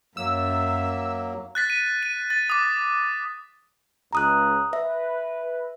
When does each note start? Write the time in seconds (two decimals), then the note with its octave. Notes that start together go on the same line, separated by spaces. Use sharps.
0.17 F#2 F#3 A#3 E5 E6
1.55 F#6 A6 B6
1.70 D#7
2.03 D#7
2.30 A6
2.50 D6 D#6
4.13 C#2 A#5 D#6 F#6
4.73 B4 E5